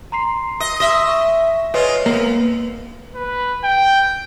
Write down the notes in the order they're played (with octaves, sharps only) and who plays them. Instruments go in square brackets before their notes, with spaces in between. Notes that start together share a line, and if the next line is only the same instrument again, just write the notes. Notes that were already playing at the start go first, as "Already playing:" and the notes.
[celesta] A#5 C6 C7
[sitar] D#5
[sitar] D#5 E5 [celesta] C6 E6
[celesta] C#6
[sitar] G#3 F4 [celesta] B4 C#5 D#5
[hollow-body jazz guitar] A#3 [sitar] B3
[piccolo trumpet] B4
G5